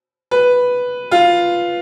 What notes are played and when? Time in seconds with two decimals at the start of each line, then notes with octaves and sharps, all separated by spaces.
0.31 B4
1.11 F4